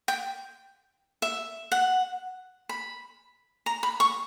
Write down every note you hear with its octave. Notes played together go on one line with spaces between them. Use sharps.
G5
E5
F#5
B5
A#5
B5
C#6